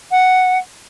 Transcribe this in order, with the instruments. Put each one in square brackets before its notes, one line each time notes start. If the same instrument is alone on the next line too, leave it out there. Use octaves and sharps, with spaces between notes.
[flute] F#5